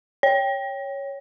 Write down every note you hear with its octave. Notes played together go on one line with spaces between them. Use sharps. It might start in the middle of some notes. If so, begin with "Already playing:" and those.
C#5